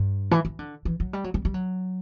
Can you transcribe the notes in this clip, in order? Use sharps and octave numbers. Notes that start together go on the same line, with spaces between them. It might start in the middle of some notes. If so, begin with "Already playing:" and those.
Already playing: G2
E3
E3
D3
E3
F#3
G3
F#3
G3
G3
F#3